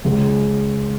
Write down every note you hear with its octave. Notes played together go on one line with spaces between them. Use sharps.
C#2 C#3 G#3